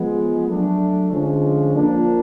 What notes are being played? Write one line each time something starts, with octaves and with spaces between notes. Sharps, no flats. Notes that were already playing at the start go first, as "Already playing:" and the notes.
Already playing: F3 G#3 B3
F#3 A3 D4
D3 F3 G#3 C#4
F3 A#3 D4